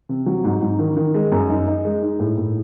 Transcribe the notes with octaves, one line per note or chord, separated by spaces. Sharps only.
C3
F#3
G#2
G#2
D#3
D#3
G#3
F#2
D#4
D#4
G#3
D#4
A2
A2